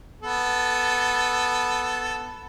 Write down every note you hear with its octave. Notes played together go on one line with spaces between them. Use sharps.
B3 A4